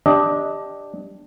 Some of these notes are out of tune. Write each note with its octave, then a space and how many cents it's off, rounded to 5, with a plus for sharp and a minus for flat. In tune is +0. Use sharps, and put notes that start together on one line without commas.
D4 +0 G4 +10 D#5 +20